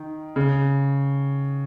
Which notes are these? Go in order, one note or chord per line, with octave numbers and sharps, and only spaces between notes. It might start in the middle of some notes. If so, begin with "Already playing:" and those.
Already playing: D#3
C#3